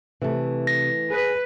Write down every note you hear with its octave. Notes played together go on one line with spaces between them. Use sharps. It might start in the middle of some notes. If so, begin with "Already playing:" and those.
C3 E3 A3
A#6
G#4 B4